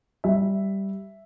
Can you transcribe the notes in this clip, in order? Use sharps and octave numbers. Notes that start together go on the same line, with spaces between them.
G3 E5